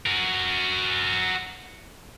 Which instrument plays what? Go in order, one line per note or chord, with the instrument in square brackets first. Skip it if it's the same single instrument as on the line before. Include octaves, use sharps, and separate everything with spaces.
[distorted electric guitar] F#4 A#4